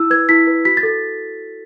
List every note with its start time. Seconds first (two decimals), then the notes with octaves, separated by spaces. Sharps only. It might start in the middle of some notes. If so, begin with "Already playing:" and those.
Already playing: E4 E6
0.10 B4 G#6
0.29 E4 B6
0.47 B4
0.65 F#4 B6
0.77 A6
0.83 A4